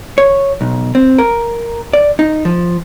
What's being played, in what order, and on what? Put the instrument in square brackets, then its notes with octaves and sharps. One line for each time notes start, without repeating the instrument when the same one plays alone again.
[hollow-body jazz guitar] C#5
B1
C4
A#4
D5
D#4
F3